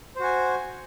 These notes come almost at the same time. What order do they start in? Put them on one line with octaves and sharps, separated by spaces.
C5 F#4 G#5